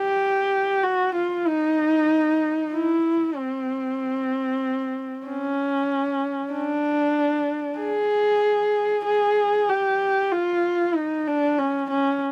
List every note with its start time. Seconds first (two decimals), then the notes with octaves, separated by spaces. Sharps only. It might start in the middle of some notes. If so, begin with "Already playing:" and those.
Already playing: G4
0.83 F#4
1.15 F4
1.47 D#4
2.74 E4
3.36 C4
5.26 C#4
6.52 D4
7.79 G#4
9.05 G#4
9.69 G4
10.32 F4
10.95 D#4
11.27 D4
11.58 C#4
11.90 C#4